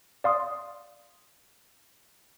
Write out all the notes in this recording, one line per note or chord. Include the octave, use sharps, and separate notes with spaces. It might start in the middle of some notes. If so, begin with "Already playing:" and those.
D5 F5 C6 D#6